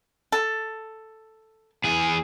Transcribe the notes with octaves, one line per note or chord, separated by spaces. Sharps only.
A4
E2 G#4